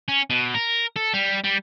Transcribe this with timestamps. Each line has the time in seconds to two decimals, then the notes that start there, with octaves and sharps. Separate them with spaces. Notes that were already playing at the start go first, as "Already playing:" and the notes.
0.08 C#4
0.30 B2
0.54 A#4
0.96 A4
1.14 G3
1.44 G3